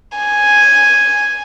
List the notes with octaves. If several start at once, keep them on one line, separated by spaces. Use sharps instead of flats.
G#5